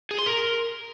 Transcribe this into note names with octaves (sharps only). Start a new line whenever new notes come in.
G#4
C6
A#4